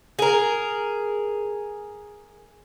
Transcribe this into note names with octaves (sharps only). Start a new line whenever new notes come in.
G#4 A#4